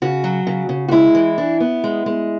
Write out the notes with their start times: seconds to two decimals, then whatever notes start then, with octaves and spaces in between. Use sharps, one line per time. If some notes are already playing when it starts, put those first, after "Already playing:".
0.02 C#3 F#4
0.24 F#3
0.47 C#3
0.69 C#3
0.88 F#4
0.91 G#3 E4
1.15 E3
1.38 D4
1.60 B3
1.84 G#3
2.06 G#3